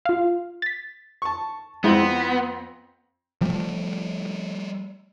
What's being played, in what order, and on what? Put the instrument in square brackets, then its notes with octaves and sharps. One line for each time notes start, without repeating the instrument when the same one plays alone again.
[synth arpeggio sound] F4 F5
A6 B6
[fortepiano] A5 C#6
[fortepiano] F2 C4 [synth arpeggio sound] G#3 E4 [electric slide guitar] B3
[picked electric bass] F3 G3 A3